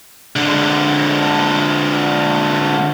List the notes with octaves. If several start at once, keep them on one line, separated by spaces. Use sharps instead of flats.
D3 G#3